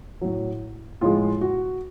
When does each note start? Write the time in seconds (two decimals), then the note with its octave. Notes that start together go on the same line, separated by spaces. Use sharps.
0.21 A2 F#3
1.01 A2 F3 G#3 F4
1.41 F#4